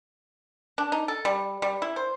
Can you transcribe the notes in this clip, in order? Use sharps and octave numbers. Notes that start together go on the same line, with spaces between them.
D4
D#4
A4
G3
G3
E4
C5